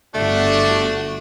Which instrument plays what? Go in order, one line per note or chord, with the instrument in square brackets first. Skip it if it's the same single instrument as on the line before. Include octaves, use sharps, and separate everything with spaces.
[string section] G1 F#4 [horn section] A3 D4